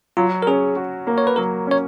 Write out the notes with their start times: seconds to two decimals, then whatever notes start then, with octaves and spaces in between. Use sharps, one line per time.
0.17 F#3 F4
0.42 A#4
0.47 C#4 G#4
0.76 F#4
1.07 A#3
1.18 C#5
1.27 B4
1.36 F#3 A#4
1.67 C#4 C#5